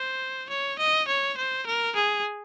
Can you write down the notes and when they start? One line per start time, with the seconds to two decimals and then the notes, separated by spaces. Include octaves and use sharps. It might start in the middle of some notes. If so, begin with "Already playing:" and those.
Already playing: C5
0.49 C#5
0.79 D#5
1.07 C#5
1.37 C5
1.66 A#4
1.96 G#4